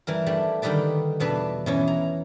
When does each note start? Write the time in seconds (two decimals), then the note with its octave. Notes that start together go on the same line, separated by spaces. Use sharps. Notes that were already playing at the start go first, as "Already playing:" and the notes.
0.07 E3 G3 A#4
0.26 G3 A3 D4
0.62 D3 D#3 G3 D#4 B4 D5
1.20 E2 B2 D4 B4 E5
1.66 B2 E3 C#4
1.88 A#5